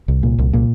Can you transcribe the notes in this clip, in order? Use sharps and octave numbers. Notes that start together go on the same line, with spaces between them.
C2
A#2
C2
A#2